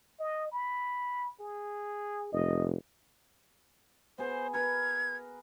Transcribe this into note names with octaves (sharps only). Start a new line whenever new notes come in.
D#5
B5
G#4
F1 D#5
B3 G#4 C5
A#4 B4 G#6